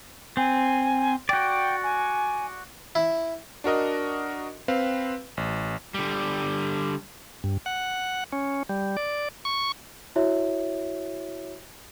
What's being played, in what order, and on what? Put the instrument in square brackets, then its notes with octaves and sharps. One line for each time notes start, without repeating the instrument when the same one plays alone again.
[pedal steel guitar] C4 [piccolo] G#5
[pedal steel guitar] F#4 D5 [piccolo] G5
[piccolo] G#5
[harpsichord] E4
[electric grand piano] D4 F#4 A#4 D#5
C4 B4 F5
A1
[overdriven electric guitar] D3 G3
[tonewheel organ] G2
F#5
C#4
G3
D5
C#6
[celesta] E4 F#4 C#5 E5